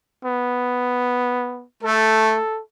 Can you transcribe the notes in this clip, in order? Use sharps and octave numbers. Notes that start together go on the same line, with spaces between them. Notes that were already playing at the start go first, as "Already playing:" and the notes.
B3
A3 A4